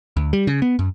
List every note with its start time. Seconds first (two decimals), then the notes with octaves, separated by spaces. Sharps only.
0.17 D2
0.33 G3
0.47 C#3
0.62 B3
0.79 F#2